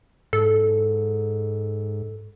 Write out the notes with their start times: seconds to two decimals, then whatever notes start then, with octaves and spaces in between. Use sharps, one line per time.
0.33 G#2 A4